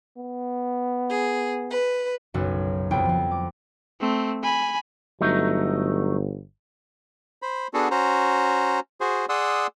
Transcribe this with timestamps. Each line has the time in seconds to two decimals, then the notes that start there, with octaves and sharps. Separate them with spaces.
0.17 B3
1.08 G#4
1.70 B4
2.34 F#1 B1 F#2 F#4 A4 B4
2.91 F#1 C2 F2 B3 G5
3.05 F2 F3
3.31 D6
4.01 A3 C4
4.43 G#5 B5
5.21 G1 F#3 A3 D#4
7.42 C5 B5
7.74 B3 D4 F#4 G#4 A4
7.91 C#4 F#4 C5 A#5
9.01 F#4 G#4 C5
9.29 G#4 D5 F#5 C6 D#6 E6